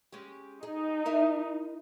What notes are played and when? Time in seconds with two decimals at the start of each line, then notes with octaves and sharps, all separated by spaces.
0.12 G#3 C#4 G4
0.63 D#4 G#4
1.05 E4 A#4 E5